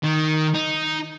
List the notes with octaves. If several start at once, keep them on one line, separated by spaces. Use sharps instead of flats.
D#3
D#4